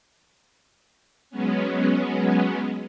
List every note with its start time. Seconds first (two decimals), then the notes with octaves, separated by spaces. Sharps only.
1.30 F#3 G#3 B3 C#4